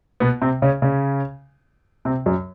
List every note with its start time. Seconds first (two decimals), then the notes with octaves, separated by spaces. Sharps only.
0.20 B2 B3
0.42 C3 C4
0.62 C#3 C#4
0.82 C#3 C#4
2.05 C3 C4
2.26 F#2 F#3